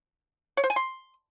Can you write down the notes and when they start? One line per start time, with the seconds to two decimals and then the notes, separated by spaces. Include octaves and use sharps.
0.57 C#5
0.64 C5
0.70 G#5
0.76 C6